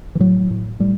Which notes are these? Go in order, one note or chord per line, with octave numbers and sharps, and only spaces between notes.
E3
A2 F#3
A2
A2 G3